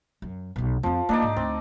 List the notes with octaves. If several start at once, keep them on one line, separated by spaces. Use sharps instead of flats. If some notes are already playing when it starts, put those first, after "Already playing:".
F#2
B1 B2
F2 F3 C4
A#3 D4 D#4 D5
G#2
D2 C4